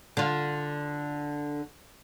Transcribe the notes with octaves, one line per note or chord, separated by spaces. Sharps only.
D3 F4